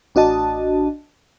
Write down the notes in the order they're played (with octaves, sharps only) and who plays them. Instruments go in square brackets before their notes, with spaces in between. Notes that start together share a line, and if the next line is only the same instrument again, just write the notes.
[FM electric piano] A1 D4 F#4 D#5 A5